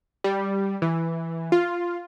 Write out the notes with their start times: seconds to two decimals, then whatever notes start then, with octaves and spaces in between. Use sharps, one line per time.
0.24 G3
0.82 E3
1.52 F4